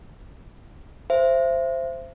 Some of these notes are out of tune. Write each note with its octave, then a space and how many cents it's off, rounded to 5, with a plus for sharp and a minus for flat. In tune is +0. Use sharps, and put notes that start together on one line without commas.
C5 +0 E5 +35